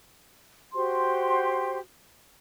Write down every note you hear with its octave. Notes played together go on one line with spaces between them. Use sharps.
F#4 G4 C5 C6